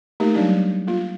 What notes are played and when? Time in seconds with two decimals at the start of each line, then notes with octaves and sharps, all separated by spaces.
0.20 A3 A#3 D#4 G4 A#4
0.34 F#3 G3 A#3 D4 D#4 G4
0.87 A#3 F4